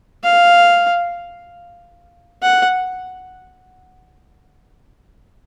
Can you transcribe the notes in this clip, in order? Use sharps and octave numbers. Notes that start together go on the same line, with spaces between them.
F5
F#5